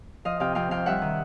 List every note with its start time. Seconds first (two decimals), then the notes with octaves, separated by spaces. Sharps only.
0.25 F3 D#5 F5
0.40 C3 F5 G5
0.55 F2 F5 G5
0.71 C3 F5 G5
0.86 G2 E5 F#5
1.02 D#3